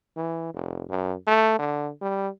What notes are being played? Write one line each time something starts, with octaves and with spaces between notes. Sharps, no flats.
E3
F1
F#2
A3
D3
G3